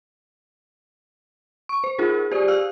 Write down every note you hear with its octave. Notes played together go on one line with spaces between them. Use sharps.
C#6
C5
D#4 F4 G#4 A#4
G4 C5 D5
F5 E6 F6